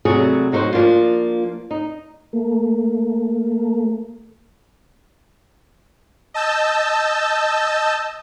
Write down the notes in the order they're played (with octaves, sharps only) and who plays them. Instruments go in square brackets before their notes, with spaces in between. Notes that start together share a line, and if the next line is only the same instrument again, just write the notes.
[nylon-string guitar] C3 F#3 G3 A3 F#4 G#4
F#3 D#4 F#4 A4 C5
F3 A#3 D4 F4
D#4
[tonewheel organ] A3 A#3
[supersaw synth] D#5 A5 E6 G6